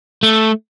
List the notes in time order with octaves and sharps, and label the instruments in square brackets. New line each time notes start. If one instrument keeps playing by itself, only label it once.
[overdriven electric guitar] A3